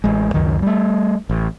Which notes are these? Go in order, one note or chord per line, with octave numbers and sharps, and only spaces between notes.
A1 G#3
C#2 F#2 D#3
G3 A3
A1